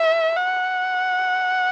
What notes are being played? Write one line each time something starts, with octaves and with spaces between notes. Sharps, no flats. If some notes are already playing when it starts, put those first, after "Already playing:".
Already playing: E5
F#5